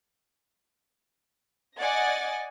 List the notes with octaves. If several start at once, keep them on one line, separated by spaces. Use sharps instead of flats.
D5 D#5 F#5 G#5 A6